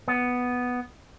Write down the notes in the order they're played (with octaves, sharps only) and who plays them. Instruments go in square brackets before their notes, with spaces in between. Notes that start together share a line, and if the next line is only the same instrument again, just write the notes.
[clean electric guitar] B3